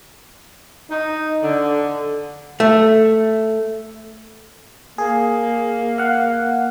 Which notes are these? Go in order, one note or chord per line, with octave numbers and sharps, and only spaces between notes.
D#4
D3
A3
A#3 G#4
F5 F#5